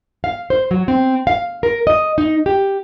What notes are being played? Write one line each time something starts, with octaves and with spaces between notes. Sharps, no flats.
F5
C5
F#3
C4
F5
A#4
D#5
D#4
G4